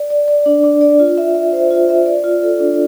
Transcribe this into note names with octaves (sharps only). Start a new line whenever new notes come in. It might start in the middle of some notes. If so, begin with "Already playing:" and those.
Already playing: D5
D5
D5
D4
D4
D5
F4
E5
E5
C5
F4
E5
D5
F4
A4
D4